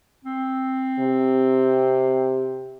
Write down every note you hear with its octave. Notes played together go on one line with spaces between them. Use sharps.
C4
C3